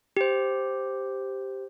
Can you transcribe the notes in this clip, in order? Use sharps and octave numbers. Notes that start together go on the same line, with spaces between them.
G4 C5